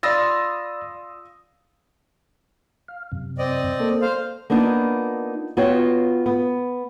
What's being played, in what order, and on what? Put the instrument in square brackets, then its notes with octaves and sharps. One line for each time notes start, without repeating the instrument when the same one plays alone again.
[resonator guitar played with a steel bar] F4 [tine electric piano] D5 B5 A6 [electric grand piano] D#6 E6 A#6
[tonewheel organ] F5
F#2 C3
[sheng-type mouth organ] C4 D5 D#5
[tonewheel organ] A#3 A4
[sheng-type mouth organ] C5 F5
[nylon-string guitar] A#3 B3 D4 D#4 F4
B3 F4 F#4 C#5 D#5 G5
B3